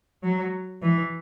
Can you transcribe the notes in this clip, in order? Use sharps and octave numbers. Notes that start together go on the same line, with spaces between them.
F#3
E3